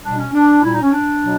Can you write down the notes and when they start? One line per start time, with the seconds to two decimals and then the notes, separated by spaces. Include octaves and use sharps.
0.03 B2 G3 D4
0.18 C#4
0.34 D4
0.63 A#2 G3 E4
0.73 D#4
0.82 C#4
0.92 D4
1.22 B2 F#3